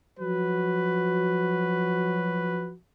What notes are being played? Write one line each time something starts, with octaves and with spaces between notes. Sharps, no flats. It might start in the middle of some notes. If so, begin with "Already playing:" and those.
F3 F#3 F#4 B4